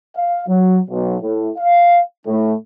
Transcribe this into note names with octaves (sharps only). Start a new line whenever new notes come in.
F5
F#3
B1
A2
F5
A2